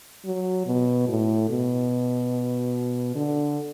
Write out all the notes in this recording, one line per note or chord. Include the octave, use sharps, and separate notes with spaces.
F#3
B2
A2
B2
D3